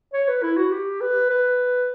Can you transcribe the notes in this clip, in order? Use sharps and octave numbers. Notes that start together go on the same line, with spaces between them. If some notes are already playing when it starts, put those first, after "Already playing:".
C#5
B4
E4
F#4
G4
B4
B4